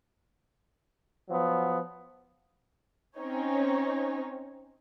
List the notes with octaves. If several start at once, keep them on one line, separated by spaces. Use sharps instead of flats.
F3 F#3 B3
C4 C#4 D#4 C#5